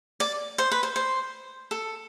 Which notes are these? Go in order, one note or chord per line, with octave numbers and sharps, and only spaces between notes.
D5
C5
B4
C5
C5
A4